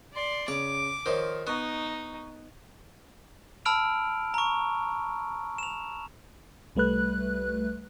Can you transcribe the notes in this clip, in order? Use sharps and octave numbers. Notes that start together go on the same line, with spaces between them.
D5 C6
C#3 C#5 D6
D#3 F3 C5 C#5
B3 D#4 C#6
A5 B5 E6 F6 D7 F7
A#5 C#6
E7 F7
C2 G3 A3 B4 F#6